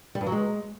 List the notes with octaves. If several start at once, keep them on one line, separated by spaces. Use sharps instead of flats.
G3
G2
F#3
G#3